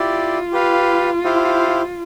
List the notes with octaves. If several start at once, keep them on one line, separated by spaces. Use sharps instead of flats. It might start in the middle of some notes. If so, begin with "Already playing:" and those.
Already playing: E4 F4 G4 D5
G4 B4 F5
E4 G4 C5 F5